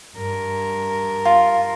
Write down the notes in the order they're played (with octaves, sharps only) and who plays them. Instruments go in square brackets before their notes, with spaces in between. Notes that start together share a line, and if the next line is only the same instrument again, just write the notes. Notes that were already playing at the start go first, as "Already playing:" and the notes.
[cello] G2 A#4
[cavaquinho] F4